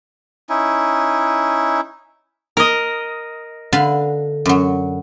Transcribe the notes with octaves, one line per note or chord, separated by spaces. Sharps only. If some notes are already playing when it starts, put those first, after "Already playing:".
C#4 D#4 E4
A#4 D#5
D3 B4 F5
F#2 F#3